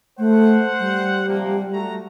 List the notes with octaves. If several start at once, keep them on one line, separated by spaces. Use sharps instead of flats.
A3 C5 F#5
G3
C3 F3 A#3
A3 F#4 A#5